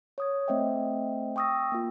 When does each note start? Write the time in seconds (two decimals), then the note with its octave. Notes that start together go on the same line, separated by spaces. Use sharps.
0.18 C#5 D#6 G#6
0.48 A3 C4 C5 D#5 E5 G5
1.36 G5 C#6 D#6 E6 A#6
1.72 A#3 F4